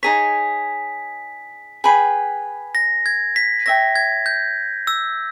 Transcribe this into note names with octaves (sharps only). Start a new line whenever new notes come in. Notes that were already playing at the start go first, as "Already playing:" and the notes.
D#4 G#4 C#5 B6
G#4 B4 G5 B5
A#6
G#6
B6
C#5 E5 G5 A#6
G#6
G6
E6